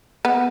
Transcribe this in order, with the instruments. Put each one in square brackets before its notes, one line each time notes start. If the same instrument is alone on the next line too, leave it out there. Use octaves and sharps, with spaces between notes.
[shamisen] B3